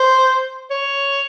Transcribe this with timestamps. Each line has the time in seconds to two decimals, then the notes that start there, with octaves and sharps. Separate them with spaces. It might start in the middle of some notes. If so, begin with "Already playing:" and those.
Already playing: C5
0.70 C#5